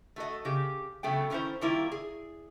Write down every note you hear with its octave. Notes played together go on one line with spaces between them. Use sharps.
A3 F#4 A4 D#5
C#3 G4
C#3 F#3 A3 B3 G5
D3 D#3 C#4 E4 C5
D#3 G3 A#3 E4 F4
G#4